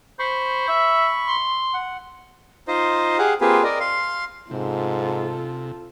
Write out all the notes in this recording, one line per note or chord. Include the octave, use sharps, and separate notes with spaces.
C5 B5 C#6
E5
C6
F#5
D#4 F4 C5 D#5
G4 G#4 F5 F#5
A#3 C4 F4 G4 G#4 B4
A#4 D5 D#5
F5 C6
G#2 C3 F4 A4